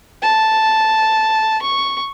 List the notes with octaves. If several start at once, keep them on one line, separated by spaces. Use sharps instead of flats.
A5
C#6